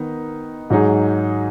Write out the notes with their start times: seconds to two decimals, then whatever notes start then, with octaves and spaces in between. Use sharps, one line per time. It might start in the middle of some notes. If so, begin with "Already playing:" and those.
Already playing: D#3 B3 D#4
0.70 G#2 F#3 D#4 G#4